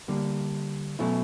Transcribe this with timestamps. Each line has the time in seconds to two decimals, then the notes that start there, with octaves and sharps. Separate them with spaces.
0.08 D3 G3 A#3
0.99 B2 F#3 A3 C#4 E4